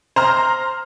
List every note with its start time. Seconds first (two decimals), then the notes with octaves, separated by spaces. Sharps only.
0.16 C5 A#5 F6